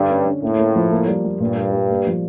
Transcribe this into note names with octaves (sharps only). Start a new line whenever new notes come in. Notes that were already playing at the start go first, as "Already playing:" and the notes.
Already playing: G2 D3
C#4
D3
A2 A#3
A#3
F3
A#3
G3
G3
G2 A#2
A#3
G3
A#3
F3